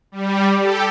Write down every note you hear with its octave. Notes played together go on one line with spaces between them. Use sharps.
G3
G4 A4